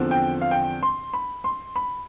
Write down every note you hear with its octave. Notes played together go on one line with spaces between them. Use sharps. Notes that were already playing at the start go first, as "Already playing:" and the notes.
Already playing: E2 D3 F3 C4
G5
F5
G5
C6
B5
C6
B5